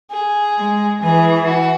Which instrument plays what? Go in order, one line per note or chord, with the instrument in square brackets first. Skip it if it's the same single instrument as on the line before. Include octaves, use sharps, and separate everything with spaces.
[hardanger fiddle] G#4
[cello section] G#3
[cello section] E3 [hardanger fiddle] G#4
[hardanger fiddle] F#4